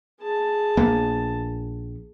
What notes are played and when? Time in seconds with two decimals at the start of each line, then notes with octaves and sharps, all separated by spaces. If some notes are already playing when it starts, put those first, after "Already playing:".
0.21 G#4 A5
0.77 A#1 A#3 B3